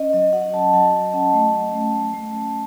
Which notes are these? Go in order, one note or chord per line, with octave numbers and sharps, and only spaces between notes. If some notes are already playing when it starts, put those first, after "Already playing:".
Already playing: C#4 D#5
F#3 D#5
F#4 F#5
F#3 A5
F#3 F#5
F#3
C#4 A5
A3
A3
A3
A3
A3
A3